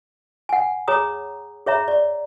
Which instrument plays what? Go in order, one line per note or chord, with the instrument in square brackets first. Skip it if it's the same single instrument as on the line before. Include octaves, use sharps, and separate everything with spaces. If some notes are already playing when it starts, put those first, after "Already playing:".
[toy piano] F#5 G#5
G#4 C#5 A#5 D#6
G#4 C#5 E5 A#5
D5